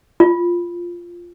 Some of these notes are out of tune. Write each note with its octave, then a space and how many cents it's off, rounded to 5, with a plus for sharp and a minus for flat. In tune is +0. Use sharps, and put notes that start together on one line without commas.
F4 -5